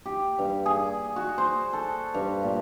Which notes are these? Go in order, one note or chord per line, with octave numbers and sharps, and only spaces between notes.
G4
G2
G#4
F#4
C5
A4
G2
A#2